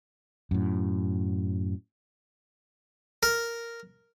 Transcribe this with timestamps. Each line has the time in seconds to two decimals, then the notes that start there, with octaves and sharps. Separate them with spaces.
0.51 F#2 A2
3.23 A#4